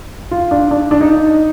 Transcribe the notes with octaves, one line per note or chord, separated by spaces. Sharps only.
F4
D4
D4
D4
D#4